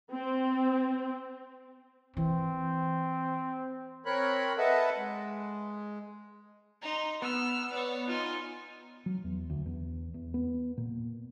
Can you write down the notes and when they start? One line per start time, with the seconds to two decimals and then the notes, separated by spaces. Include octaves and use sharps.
0.11 C4
2.17 E3 C4
4.06 C4 A#4 C#5 B5 F#6
4.58 A4 B4 D#5 E5 F#5 A5
4.97 G#3
6.82 D#4 A#5 C6
7.22 B3 E6 F6
7.72 C#5 D5
8.07 D#4 F4 G#5 C6
9.06 F#3
9.24 E2
9.50 D2
9.66 E2
10.14 E2
10.34 B3
10.77 A#2